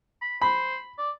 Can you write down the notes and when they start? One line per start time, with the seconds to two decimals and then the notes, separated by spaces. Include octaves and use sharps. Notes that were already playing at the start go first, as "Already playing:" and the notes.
0.21 B5
0.42 C5 B5
0.98 D5